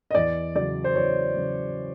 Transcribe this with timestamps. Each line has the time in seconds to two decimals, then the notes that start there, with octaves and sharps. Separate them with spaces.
0.11 D#5
0.15 E2 D5
0.55 C#3 F#3 D5
0.84 C5
0.95 E2 C#5
1.36 C#3 F#3